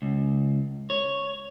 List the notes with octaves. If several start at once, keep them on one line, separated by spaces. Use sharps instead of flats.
C#2
C#5